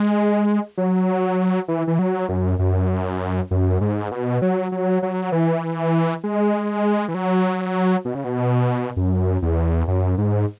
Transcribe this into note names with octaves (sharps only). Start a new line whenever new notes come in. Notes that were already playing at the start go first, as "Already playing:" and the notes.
Already playing: G#3
F#3
E3
E3
F#3
F#2
F#2
F#2
G#2
B2
F#3
F#3
F#3
E3
G#3
E3
F#3
B2
C#3
B2
F#2
E2
F#2
G#2